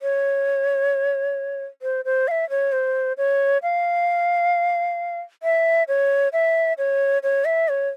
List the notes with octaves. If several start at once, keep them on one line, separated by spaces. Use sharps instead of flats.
C#5
C5
C5
F5
E5
C#5
C5
C#5
F5
E5
C#5
E5
C#5
C#5
E5
C#5